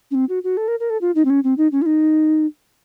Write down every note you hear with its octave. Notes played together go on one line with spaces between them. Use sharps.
C#4
C4
F#4
F#4
A4
A#4
A#4
A4
F4
D#4
C4
C#4
C4
D#4
C#4
F4
D#4